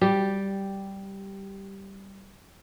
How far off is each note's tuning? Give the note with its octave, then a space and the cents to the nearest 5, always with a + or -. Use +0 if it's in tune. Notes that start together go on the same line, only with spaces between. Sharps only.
G3 -5 G4 +0